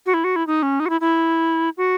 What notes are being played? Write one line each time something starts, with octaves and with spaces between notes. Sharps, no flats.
F#4
E4
F#4
E4
D#4
C#4
D#4
F#4
E4
E4
F#4